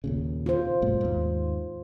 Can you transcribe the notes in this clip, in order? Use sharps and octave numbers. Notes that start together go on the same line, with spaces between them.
D#2 A#2 C#3
F4 C5
G2 B2 A3
D#2 G#2